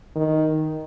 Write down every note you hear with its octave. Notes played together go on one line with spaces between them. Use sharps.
D#3